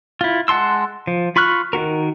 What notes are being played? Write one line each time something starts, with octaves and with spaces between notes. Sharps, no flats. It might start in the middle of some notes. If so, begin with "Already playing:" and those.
E4 F4
G#3 F#5 A5 C6 E6
F3
F4 B5 C#6 F6 F#6
D#3 E4 F#4 A#4